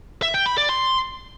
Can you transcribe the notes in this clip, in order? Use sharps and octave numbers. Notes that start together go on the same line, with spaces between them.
E5
G5
B5
D5
C6